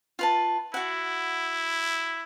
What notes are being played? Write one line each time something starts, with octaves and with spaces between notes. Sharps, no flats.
F4 B4 A5
E4 F#4 F#5